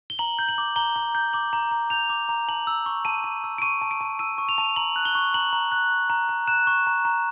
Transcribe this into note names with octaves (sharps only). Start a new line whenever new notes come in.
G7
A#5 F#7
G6
F#7
D6
A#5 G7
A#5
G6
D6 F#7
A#5
A#5
G6 F7
D6
A#5
A5 F#7
E6
C#6
A5 D#7
A5
E6
D7
C#6 D#7
A5
D7
A5
E6 D#7
C#6
F7
A5
A#5 F#7
F#6
G7
C#6
A#5 F#7
A#5
F#6
C#6
A#5
A#5
F#6 E7
C#6
A#5
A#5